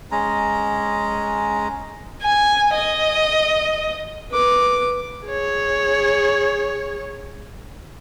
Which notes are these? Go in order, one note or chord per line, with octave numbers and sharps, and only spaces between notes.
G#3 C#4 A#5
G#5
D#5
B4 D6
G#4 C#5